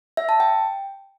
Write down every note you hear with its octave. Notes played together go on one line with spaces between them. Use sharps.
E5
A5
G5